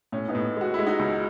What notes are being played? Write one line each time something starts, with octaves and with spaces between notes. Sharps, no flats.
A2 C#4
B3 D#4
A2
G#3 F#4
G#3 E4
D#4 F#4
C#2